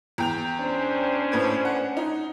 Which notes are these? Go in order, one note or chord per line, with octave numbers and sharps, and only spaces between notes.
E2 G5 F7
C#4 D4 C5
A2 B4 G#6
F#5
D#4